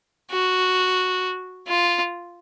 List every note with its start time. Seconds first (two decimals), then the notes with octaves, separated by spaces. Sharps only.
0.31 F#4
1.68 F4